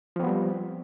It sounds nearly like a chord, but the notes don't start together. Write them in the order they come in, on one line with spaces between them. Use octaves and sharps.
F3 C4 B3 G3